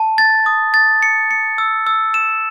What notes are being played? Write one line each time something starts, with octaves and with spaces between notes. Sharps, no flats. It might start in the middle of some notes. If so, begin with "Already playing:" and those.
Already playing: A5
A6
D#6
A6
C#7
C#7
E6
E6
E7